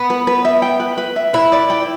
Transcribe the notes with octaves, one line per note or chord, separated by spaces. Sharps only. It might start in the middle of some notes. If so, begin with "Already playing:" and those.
Already playing: B3
B4
B4
E5
G5
B4
B4
E5
E4 B4
D5
G5